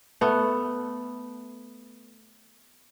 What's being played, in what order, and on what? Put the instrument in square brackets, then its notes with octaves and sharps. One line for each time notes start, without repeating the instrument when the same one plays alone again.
[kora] A3 B3